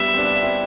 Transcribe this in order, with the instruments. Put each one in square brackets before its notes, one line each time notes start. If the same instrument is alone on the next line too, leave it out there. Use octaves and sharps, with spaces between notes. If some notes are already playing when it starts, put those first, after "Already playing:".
Already playing: [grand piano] G3 B3 [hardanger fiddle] E5
[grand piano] C4
B3 D4
C4 E4